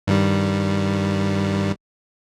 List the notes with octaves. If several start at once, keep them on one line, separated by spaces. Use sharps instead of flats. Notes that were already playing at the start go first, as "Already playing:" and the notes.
G2 D#3 G3